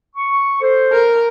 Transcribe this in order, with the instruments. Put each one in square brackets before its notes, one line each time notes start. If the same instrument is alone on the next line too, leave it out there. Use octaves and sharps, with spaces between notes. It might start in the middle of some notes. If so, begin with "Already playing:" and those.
[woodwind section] C#6
A4 C5
[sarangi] A#4